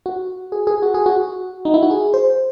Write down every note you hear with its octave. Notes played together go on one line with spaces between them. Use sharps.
F#4
G#4
G#4
F#4
G#4
F#4
D#4
E4
F#4
G#4
C5